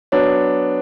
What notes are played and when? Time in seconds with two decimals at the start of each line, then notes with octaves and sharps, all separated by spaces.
0.12 F#3 B3 D4 C#5